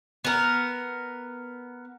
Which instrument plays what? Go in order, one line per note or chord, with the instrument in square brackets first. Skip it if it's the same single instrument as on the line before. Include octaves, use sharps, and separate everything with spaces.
[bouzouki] B3 A#4